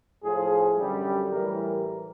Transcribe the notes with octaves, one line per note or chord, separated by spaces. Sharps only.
A2 F3 G#4
F#2 D3 G3
A2 E3 G3 A#4